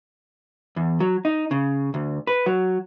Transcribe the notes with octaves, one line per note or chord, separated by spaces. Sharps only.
E2
F#3
D#4
C#3
D2
B4
F#3